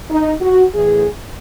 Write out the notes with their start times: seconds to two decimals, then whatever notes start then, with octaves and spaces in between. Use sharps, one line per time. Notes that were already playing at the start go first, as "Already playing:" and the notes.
0.10 D#4
0.41 F#4
0.73 A2 E3 G#4